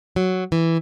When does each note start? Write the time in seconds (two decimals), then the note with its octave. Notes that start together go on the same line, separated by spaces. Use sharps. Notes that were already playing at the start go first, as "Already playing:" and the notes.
0.16 F#3
0.52 E3